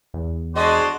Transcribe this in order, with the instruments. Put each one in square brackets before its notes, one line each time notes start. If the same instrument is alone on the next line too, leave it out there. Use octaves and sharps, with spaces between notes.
[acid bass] E2
[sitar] G#3 D#5 [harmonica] D4 C5 D5 [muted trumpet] F#4